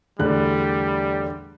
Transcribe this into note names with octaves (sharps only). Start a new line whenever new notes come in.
E2 A2 D3 G3 F#6